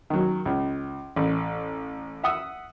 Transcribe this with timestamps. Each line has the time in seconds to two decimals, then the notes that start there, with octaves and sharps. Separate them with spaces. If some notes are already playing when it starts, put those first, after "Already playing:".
0.10 D#3 F#3
0.45 C#2
1.16 A1
2.23 E5 F#5 D#6 E6